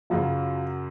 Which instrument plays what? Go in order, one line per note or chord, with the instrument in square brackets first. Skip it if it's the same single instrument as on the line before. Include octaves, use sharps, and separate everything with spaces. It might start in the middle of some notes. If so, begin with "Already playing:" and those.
[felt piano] F#2 C#3 F#3 [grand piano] F4